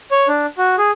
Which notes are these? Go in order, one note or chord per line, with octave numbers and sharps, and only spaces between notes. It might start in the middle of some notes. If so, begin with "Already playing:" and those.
C#5
D4
F#4
G#4